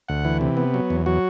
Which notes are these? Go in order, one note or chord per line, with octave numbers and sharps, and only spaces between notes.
D2 F#5
E3
C3
B3
F#3
E2
F#3 F#4